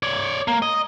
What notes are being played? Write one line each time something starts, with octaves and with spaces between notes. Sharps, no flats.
C#5 D5
A#3
D#5